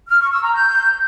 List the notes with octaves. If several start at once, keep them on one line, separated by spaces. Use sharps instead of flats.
F6
C#6
E6
A#5
G6